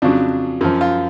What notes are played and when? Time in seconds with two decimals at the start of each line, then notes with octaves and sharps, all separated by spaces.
0.02 F2 C#3 F#3 D4
0.61 F#2 F3
0.81 F4